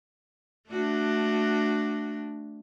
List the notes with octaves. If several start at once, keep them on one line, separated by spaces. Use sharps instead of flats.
A3 D4 F#4